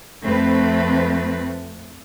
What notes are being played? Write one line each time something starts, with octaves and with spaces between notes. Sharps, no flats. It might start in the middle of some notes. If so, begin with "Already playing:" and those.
F2 A3 C4 B4